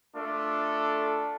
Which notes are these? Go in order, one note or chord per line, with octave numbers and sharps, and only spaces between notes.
A3 D4 F4 A4